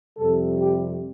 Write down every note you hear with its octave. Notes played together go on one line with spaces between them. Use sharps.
F2 C3 G3 A4
G4